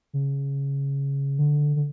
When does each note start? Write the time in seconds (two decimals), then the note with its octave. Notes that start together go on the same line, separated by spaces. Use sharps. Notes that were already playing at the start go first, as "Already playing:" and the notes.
0.13 C#3
1.39 D3
1.76 D3